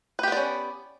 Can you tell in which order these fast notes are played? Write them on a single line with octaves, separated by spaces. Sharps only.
B4 G4 B3 D5 C#4